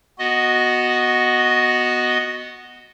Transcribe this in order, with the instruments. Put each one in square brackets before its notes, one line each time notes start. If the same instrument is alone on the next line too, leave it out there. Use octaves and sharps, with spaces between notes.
[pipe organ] B3 F#4 D#5